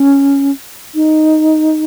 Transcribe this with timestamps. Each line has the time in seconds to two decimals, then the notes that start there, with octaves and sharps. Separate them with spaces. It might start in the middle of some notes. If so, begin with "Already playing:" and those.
Already playing: C#4
0.95 D#4